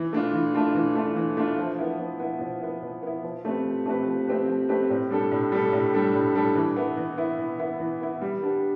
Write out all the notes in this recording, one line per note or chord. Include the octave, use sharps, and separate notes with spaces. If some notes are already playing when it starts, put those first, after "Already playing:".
Already playing: E3
A3 D4 F4
E3
A3 D4 F4
E3
A3 D4 F4
E3
A3 D4 F4
F3
B3 E4
F3
B3 E4
F3
B3 E4
F3
B3 E4
F3
A3 C4 G4 B4
F3
A3 C4 G4 B4
F3
A3 C4 G4 B4
F3
A3 C4 G4 B4
A2
G3 D4 A4
A2
G3 D4 A4
A2
G3 D4 A4
A2
G3 D4 A4
E3
B3 E4
E3
B3 E4
E3
B3 E4
E3
B3 E4
G3
B3 D4 G4